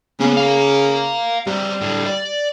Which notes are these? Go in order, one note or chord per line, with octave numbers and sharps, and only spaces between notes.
C#3 A#3 B3
F5 A#5
G3 C4 A#5
A2 D3
D5